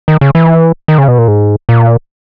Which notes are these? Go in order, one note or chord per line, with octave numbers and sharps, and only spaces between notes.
D#3
C#3
E3
D#3
C#3
B2
A#2
G#2
A#2